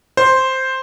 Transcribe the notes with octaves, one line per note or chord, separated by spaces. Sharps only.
C5